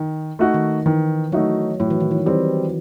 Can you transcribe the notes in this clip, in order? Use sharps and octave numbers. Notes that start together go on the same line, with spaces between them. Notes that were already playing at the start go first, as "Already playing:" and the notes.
Already playing: D#3
A3 D#4 F#4
D#3
D#3 E3
F#3 A3 D#4 F#4
A2 F#3
E3
D#3
E3
E3 G3 C4